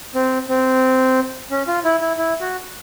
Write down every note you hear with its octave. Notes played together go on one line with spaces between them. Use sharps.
C4
C4
C#4
F4
E4
E4
E4
F#4